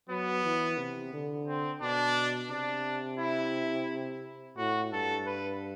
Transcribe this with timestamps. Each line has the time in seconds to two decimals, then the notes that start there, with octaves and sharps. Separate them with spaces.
0.09 F#3 B3
0.45 E3
0.78 C3
1.13 D3
1.48 C4
1.81 B2 D4
2.50 C3 D4
3.20 E4
4.57 A2 F#4
4.92 G2 A4
5.26 B4